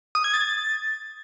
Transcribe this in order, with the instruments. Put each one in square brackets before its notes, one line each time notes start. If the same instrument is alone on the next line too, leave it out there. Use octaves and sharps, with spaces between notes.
[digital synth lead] D#6
G#6
A6